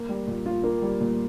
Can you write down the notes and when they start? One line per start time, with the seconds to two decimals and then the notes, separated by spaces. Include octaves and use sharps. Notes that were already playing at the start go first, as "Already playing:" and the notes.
Already playing: A#3
0.09 G3
0.27 A#2
0.46 F4
0.64 A#3
0.82 G3
1.01 A#2